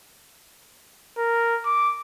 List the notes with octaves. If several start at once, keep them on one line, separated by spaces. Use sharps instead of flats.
A#4
D6